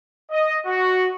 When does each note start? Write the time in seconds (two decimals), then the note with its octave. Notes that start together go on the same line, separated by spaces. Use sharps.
0.30 D#5
0.66 F#4